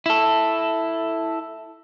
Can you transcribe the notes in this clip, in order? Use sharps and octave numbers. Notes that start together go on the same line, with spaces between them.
E4 A4